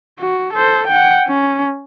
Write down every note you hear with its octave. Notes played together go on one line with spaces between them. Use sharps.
F#4
A4 C5
F#5 G5
C#4